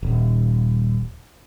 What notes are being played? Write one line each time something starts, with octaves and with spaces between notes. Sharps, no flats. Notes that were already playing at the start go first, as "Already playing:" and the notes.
D#1